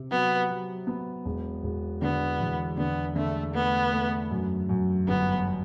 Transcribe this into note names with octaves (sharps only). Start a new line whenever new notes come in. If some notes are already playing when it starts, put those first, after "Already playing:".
Already playing: C3
F#3 B3
F#3
B3
E1
E1
D3 B3
E2
D3 B3
D3 A3
A3 B3
A3
F#2
F#2
G1 B3